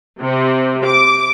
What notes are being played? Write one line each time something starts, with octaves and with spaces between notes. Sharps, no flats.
C3
D6